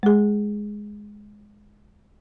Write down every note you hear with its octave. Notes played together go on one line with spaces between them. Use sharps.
G#3 G#4